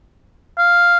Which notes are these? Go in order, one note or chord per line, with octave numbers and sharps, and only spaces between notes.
F5